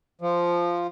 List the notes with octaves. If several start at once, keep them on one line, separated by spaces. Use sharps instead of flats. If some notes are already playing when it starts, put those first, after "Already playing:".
F3